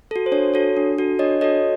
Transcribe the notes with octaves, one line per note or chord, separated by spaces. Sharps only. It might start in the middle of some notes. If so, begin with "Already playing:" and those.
F#4 A4
C5
D4 C#5
F#4 A4 C#5
D4
F#4 A4
D4 C#5 D#5
F#4 A4 C#5 D#5